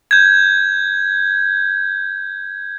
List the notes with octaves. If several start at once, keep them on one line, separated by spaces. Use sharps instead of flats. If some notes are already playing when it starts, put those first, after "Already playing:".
G6 G#6